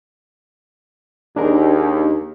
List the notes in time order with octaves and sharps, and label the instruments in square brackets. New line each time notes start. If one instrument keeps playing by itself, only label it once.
[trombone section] D#2 [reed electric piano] D4 G#4 A#4